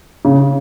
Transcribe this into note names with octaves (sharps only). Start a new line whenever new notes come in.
C#3